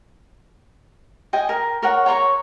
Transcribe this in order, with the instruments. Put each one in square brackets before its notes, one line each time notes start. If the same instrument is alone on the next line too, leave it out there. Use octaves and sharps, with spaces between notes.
[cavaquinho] D#5 G5 G#5
A#4
A#4 C#5 F#5
C#5 A#5 C6 C#6